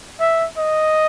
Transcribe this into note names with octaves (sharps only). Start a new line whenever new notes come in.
E5
D#5